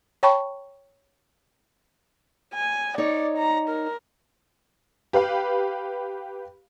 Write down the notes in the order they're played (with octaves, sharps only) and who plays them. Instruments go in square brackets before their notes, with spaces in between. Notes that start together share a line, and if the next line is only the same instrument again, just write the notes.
[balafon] C#5 G5 A5 B5 C#6
[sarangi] G#5
[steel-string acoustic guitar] D#4 C#5 [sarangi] D5
[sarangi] A#5
A#4
[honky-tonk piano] G4 B4 F5 B5